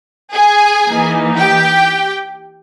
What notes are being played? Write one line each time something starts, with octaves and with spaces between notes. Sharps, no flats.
G#4 G#5
E3 A#3 D#4
G4 G5